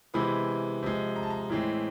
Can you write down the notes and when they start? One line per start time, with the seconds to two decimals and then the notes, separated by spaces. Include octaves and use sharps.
0.14 C3 E3 G#3 B3 B5
0.83 C3 F3 G#3
1.16 A#5
1.23 A5
1.31 A#5
1.50 A2 E3 G#3 C4